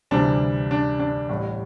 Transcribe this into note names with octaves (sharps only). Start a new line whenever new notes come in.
D2 C3 E3 G3 D4
D4
D4
A1 A2 G3